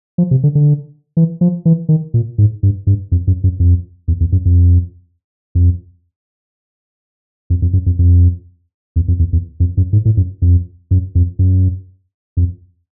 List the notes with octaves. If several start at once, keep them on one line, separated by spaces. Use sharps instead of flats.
F3
C3
D3
D3
E3
F3
E3
D#3
A#2
G#2
G2
G2
F2
F#2
F#2
F2
E2
E2
F#2
F2
F2
F2
F2
F#2
F2
F2
E2
F2
E2
E2
F2
F#2
G#2
A2
F#2
F2
F#2
F2
F#2
F2